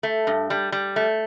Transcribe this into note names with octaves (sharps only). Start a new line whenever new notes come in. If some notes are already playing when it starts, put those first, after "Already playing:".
A3
G2
G3
G3
A3